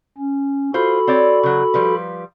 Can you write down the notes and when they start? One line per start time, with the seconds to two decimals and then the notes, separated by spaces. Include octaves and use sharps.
0.18 C#4
0.74 F4 F#4 A4 C5 B5
1.07 C4 C#5 D5
1.43 C#3 F#3
1.74 F3 G3 B4